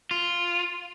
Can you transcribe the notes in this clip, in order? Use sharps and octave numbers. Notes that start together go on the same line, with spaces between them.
F4